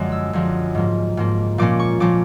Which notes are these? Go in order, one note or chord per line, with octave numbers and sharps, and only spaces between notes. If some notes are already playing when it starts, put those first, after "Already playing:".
Already playing: F#2 D3 F3 G#3
E6
F#2 D3 F3 G#3
G#2 F3 A#3
G#2 F3 A#3
A#2 F3 A#3 C#4 D6
C#6
A#2 F3 A#3 C#4 D6